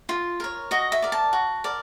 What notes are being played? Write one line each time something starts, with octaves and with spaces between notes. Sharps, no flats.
F4
A#4 C#5
F#4 D#5
E5
A#4 D5
A5
F#4
A#4 D5